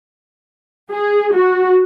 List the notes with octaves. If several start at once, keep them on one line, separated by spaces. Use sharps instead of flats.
G#4
F#4